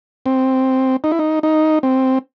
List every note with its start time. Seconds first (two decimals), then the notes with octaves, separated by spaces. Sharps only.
0.26 C4
1.04 D#4
1.12 E4
1.19 D#4
1.43 D#4
1.83 C4